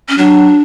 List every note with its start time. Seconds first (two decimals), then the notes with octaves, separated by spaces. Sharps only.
0.09 C#4
0.18 F#3 D4